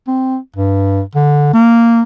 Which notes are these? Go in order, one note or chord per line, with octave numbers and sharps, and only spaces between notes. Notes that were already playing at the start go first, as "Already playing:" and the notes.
C4
G2
D3
A#3